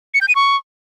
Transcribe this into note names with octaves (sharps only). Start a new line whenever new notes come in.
C#7
G6
D#7
C#6